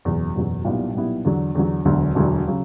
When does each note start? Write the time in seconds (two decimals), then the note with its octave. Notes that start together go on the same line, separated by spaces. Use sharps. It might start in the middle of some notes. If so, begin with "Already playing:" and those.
0.05 F#1 E2 B2 F#3
0.34 F#1 E2 B2 F#3
0.65 B1 A#2 G3 B3 E4
0.95 B1 A#2 G3 B3 E4
1.25 E2 D3 F#3
1.55 E2 D3 F#3
1.85 E1 D2 D3 F#3
2.15 E1 D2 D3 F#3
2.47 C#3 F#3